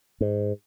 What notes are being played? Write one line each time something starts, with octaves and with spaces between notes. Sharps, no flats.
G#2